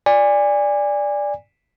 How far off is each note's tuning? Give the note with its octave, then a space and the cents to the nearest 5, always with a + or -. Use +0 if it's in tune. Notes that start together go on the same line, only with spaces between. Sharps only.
D5 +0 G#5 -25